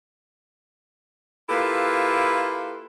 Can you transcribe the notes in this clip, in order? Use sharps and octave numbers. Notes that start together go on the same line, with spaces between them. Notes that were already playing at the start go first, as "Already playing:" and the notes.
A#3 E4 F4 G4 A4 B4